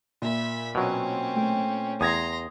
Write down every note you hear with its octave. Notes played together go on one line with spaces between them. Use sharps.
A#2 E5 B5
B2 F#3 C4 C#4
A3 G5
E2 A#5 C6 D#6 G#6 A#6